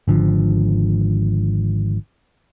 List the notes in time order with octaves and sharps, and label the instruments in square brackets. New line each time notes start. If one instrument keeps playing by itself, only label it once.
[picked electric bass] G#1 D3 F3